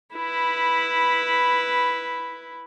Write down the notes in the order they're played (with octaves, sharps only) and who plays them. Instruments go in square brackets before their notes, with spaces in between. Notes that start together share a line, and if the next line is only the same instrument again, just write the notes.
[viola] E4 B4